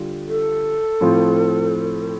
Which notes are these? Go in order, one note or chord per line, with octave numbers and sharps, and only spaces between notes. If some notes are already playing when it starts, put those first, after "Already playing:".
Already playing: D3 G3 F4
A4
A2 F3 C4 F4